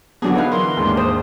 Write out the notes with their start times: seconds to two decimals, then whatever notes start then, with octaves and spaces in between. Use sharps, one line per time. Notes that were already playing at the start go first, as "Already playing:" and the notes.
0.22 D3 F#3 B3 D4 F#4 G#4
0.36 D#4 B4 F5
0.52 E3 A#4 C6
0.77 D#2 G#2 D4
0.97 C5 D#6